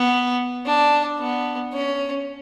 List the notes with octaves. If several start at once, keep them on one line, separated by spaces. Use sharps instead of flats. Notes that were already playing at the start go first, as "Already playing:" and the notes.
Already playing: B3
D4
B3
C#4